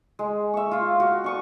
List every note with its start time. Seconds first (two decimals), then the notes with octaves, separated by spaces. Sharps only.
0.19 G#3
0.54 E5 C#6
0.71 F4 F5
1.00 F#4
1.24 D4 C#6 D#6